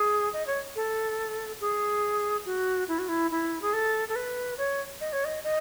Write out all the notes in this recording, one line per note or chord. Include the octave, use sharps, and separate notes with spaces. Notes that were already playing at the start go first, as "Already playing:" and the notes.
Already playing: G#4
D#5
C#5
A4
G#4
F#4
E4
F#4
E4
E4
G#4
A4
A4
B4
C#5
D#5
C#5
D#5
D#5